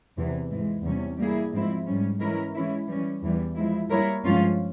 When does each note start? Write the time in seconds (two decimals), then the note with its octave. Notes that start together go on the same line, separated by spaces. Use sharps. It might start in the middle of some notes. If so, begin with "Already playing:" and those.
0.17 E2 C3 E3
0.50 G#2 E3 G#3
0.84 E2 C3 G3 C#4
1.19 G3 A#3 E4 G#4
1.53 G#2 F3 G#3 C4 E4
1.87 G#2 G3 C#4
2.20 E3 G#3 C#4 E4 A#4
2.54 E3 G#3 C#4 E4
2.89 E3 G3 C#4
3.23 E2 E3 G3
3.56 F3 G#3 E4
3.91 G3 A#3 E4 A#4 C#5
4.25 G2 F3 G#3 C#4 F4